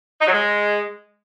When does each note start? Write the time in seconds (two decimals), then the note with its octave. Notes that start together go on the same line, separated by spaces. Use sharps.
0.21 D#4
0.27 F#3
0.33 G#3